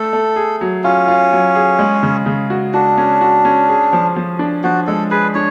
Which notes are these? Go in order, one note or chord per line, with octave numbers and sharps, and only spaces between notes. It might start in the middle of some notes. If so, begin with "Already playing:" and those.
Already playing: A3 A4
A3
G#4
F#3
C#4 F4
F4
F#3
G#4
G#3
C#3
C#3
F#4
D4 F#4
C#4
F#4
C#4
G#4
F3
F3
D4
F3 F#4
G#3 A4
G#4 B4
D4 C#5